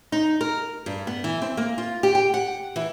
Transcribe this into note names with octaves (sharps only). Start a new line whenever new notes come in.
D#4
A#4
G2
B3
E3
C4
A#3
F4
G4
G5
F#5
E3